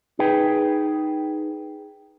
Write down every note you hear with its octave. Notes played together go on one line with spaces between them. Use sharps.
D#4 G#4 B4 G5